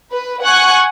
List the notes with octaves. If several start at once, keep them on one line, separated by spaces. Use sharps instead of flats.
B4
F#5 G#5 C#6 F#6